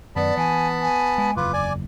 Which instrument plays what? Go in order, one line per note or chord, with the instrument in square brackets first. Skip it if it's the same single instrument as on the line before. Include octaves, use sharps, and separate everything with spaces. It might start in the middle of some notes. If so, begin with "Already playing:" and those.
[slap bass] F#2 D#3 [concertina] B3 A5 B5 [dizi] D5
[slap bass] E3 [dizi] G#5
[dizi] G#5
[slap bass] G#3
[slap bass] F#1 E2 [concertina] F4 B4 [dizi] D6
[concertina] D5 G#5